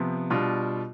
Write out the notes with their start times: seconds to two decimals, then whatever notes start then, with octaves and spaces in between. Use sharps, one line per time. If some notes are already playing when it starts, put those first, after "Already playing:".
Already playing: C3 F3 B3
0.30 B2 G3 D4 F4